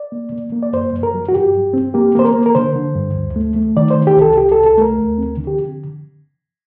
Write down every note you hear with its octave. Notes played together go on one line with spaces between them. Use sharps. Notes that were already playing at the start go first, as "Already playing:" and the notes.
Already playing: D5
A#3
A#3
A#3
D5
F#2 C5
F#2
A#4
F#3
F#4
G2 G4
G2
C4
A#3 G4
A#3 C5
A#4
A#3
A#4
D3 C5
D3
G2
D2
A3
A3
D#3 D5
C5
D#3
G4
C2 A4
C2 G4
C2 A4
A4
A3 A#4
D2
C4
D3
G4